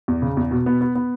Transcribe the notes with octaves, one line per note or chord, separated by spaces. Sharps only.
E2
C#3
E2
B2
B3
B3
B3